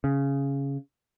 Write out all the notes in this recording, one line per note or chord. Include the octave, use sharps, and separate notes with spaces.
C#3